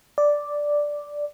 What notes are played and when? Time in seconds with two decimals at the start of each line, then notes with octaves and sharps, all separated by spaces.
0.18 D5